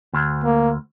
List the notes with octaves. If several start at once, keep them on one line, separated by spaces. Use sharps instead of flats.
D2
A#3